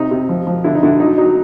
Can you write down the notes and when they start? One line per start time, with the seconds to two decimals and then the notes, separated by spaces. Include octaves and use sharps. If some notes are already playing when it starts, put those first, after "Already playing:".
Already playing: C3 D#4
0.11 C3
0.29 F3
0.47 F3
0.64 D3 E4
0.75 D#4
0.83 D3 E4
1.00 F#3 D#4
1.18 F#3 D#4